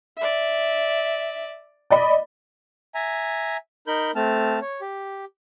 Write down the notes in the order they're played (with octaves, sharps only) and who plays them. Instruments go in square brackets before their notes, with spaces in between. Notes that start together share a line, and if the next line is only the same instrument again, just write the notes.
[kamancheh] D5 E5
[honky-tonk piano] D5 D#5 B5
[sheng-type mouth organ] E5 G#5 A#5
D#4 A#4 B5 G6
A3 C4 A5 F6
C#5
G4